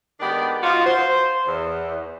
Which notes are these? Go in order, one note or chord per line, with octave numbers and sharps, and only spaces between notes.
D#3 G#3 B3 D4 G4 D5
D#4 F4 F#4
C5
E2